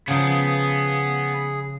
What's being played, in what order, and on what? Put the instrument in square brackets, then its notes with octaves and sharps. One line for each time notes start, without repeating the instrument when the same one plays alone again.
[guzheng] C#3 F3 [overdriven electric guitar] B3 F#5 [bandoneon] G#4